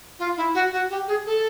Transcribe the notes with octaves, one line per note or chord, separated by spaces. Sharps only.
F4
E4
F#4
F#4
G4
G#4
A4